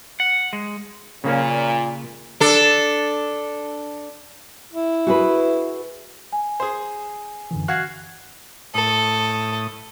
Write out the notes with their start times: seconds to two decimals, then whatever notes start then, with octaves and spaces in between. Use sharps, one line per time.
0.20 F#5
0.53 G#3
1.24 A#2 C#3 A#3 C#4
2.40 D4 A4
4.73 E4
5.07 F#4 G#4 B4
6.32 G#5
6.60 G#4 C5
7.51 F#2 D3 E3
7.68 F#4 F5 F#5 F#6 G#6 C7
8.74 A2 A4 D#6